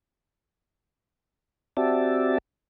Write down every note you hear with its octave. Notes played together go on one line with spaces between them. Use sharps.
C4 F#4 G4 D5 E5 A5